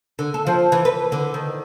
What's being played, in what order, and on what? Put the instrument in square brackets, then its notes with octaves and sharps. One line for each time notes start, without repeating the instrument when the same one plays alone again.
[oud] D3
A4
F3
E3
B4
D3
D#3